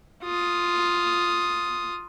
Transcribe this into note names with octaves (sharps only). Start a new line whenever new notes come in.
F4 D#6